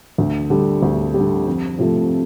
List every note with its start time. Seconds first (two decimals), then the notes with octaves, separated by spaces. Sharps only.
0.18 D2
0.50 D3 G3
0.82 D2
1.14 G3
1.19 D3
1.47 F2
1.79 C3 F3 A3